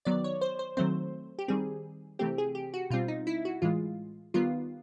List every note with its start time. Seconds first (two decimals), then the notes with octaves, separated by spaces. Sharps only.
0.05 D#3 F#3 B3 D5
0.24 C#5
0.41 C5
0.59 C5
0.77 D#3 F#3 A3 C4 C5
1.39 G4
1.48 D#3 G3 C4 G#4
2.19 C3 E3 A3 C4 G4
2.38 G#4
2.55 G4
2.74 F#4
2.90 B2 G3 C4 F4
3.08 D#4
3.27 E4
3.45 F#4
3.62 A2 E3 G#3 F4
4.34 D#3 G3 B3 F4